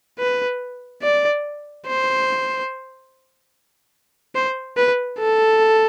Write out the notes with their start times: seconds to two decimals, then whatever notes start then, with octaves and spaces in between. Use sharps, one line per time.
0.19 B4
1.03 D5
1.87 C5
4.35 C5
4.77 B4
5.19 A4